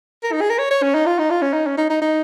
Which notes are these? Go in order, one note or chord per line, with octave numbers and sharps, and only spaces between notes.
A#4
D#4
G#4
A#4
C#5
C#5
C#4
D#4
F4
D#4
F4
C#4
D#4
C#4
D#4
D#4
D#4